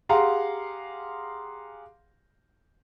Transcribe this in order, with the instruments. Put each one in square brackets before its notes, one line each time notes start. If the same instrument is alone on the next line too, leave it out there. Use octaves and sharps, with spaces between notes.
[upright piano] G4 G#4 F5 F#5 A#5 C6